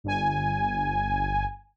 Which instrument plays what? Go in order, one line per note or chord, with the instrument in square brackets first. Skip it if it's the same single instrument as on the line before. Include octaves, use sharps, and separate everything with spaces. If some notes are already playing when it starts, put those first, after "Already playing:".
[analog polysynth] G1 G#5